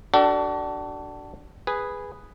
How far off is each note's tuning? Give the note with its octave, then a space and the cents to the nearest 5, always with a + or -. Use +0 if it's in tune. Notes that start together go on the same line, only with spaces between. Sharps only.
D4 +0 F#4 +40 A4 +20
G#4 -10 B4 +0